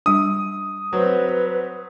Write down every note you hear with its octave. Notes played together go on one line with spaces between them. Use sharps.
G3 D4 D#6
F#3 C4 B4